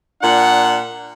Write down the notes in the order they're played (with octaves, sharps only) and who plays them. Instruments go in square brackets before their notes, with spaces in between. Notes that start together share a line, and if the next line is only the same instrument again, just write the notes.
[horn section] A#2 D4 F#5